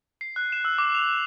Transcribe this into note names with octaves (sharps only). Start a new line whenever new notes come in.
C7
F#6
E7
E6
D6
F7